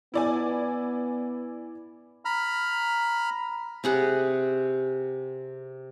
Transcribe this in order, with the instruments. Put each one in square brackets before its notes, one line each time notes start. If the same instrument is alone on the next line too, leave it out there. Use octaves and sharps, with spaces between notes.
[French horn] B3 [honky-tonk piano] E4 D5 G#5
[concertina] A#5 B5 F6
[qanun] C3 G#4 F#5